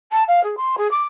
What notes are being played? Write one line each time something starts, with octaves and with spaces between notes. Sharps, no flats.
A5
F5
G#4
C6
G#4
D6